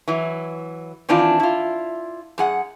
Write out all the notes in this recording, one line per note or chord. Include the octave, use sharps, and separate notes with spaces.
E3 F#3
D#3 E3 C4 D4 E4 F4
E4 F4
F#2 G#4 F#5